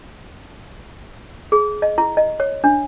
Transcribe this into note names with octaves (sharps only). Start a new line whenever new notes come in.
G#4
D#5
E4
D#5
C#5
D4